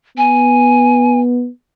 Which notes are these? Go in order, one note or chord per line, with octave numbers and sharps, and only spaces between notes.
B3 G#5